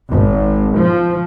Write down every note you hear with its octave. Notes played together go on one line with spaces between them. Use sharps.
G#1
F3